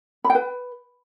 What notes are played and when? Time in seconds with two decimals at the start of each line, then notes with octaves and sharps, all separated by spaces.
0.24 B5
0.30 G5
0.35 B4